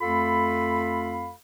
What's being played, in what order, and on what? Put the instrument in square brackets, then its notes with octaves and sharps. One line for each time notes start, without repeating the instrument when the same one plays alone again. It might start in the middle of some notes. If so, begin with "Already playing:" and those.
[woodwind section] F2 A3 F4 A4 F5 B5